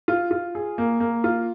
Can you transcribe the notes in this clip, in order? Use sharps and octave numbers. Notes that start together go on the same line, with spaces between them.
F4
F4
G#4
A#3
A#3
F4